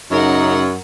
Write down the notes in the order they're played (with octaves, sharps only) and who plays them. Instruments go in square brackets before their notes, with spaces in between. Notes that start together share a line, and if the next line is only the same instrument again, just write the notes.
[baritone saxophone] F#2 [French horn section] C#3 D#4 [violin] A#4 F#5